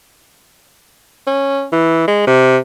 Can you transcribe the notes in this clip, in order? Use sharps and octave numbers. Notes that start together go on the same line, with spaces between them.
C#4
E3
G#3
C3